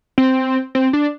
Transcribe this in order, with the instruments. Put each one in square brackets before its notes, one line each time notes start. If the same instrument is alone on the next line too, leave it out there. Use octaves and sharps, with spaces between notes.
[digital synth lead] C4
C4
D4